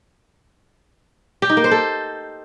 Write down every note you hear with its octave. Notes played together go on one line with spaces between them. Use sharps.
G4
D#4
A#3
C5
A4